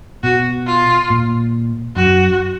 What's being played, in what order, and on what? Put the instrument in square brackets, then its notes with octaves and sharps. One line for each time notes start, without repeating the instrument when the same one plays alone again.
[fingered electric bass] B2 [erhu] F#4
[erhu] F4
[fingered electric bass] A#2
[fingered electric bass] F#2 [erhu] F#4